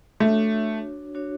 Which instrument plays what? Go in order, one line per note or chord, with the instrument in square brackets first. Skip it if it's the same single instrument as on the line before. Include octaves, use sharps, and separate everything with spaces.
[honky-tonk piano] A3 [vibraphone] D4 F#4 C#5
[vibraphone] D4 F#4 C#5